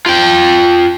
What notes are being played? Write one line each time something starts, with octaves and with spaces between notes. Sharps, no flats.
F4 G5